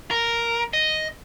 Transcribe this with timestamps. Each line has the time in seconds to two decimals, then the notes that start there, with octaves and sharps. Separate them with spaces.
0.11 A#4
0.73 D#5